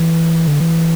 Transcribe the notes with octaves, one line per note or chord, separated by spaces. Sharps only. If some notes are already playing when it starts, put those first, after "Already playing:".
Already playing: E3
D3
E3